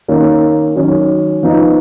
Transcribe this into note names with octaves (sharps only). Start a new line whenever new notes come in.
D#3 A#3 C#4
D#3 F#3 C#4
F3 B3 D#4